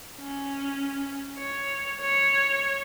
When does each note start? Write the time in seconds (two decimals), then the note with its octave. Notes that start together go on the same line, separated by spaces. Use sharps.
0.19 C#4
1.39 C#5
2.02 C#5